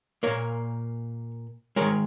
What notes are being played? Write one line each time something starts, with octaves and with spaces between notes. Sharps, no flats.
A#2 A#3 A#4 C#5
D#3 G#3 A#4 C#5